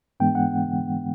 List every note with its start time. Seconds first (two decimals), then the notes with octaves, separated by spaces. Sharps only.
0.20 G#2 E3 G#3 B3 D4 G5
0.35 F#5